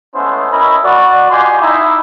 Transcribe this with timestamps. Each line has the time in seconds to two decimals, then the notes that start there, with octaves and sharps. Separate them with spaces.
0.15 G#3 A3 B3 C#4 E4 C5
0.51 C#4 E4 A#4 D#5 B5
0.84 F#4 D5
1.31 F4 G4 D#5 G#5 C6
1.61 D#4 E4